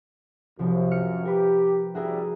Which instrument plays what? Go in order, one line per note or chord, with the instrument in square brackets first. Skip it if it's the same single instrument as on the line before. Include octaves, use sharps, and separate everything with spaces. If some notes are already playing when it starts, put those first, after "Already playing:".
[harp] C2 F3 [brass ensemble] F#2
[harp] F6 C#7
[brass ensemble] G4 [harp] A#4 B4
[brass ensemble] A1 G3 E5 [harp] F#4 G#4 A#4